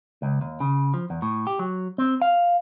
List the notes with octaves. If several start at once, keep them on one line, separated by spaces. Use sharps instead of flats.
C#2
D#2
C#3
F3
E2
A2
G4
F#3
C4
F5